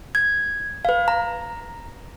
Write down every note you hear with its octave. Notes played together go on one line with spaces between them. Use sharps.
G#6
B4 F5
A#5